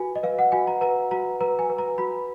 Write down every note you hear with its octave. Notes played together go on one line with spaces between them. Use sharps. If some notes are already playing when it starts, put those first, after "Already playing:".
Already playing: F#4 B4 G#5
D#5
B4 F5
F#5
F#4 G#5
A#5
B4 A#5
F#4 A#5
B4 A#5
G#5
B4
A#5
F#4 B5